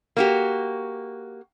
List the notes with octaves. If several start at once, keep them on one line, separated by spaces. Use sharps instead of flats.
A#3 F#4 G4